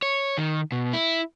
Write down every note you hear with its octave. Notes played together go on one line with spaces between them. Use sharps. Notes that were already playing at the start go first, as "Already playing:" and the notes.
C#5
D#3
B2
E4